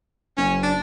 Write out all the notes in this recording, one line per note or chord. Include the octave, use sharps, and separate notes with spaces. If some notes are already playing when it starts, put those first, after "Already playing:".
F#1 C#4
D4